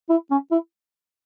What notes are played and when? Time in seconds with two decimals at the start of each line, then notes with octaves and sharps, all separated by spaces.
0.10 E4
0.31 C#4
0.51 E4